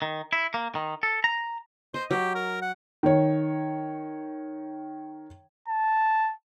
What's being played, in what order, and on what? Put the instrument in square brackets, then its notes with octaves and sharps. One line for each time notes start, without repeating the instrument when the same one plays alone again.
[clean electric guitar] D#3
E4
A#3
D#3
A4
A#5
[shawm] C5 [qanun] D#5
[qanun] F#3 [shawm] G4
[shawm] A#4
F#5
[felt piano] D#3 C#5
[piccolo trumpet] A5